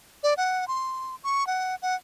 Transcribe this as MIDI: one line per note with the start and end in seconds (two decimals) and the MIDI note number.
0.23 0.34 74
0.37 0.68 78
0.68 1.15 84
1.24 1.47 85
1.47 1.75 78
1.82 1.95 78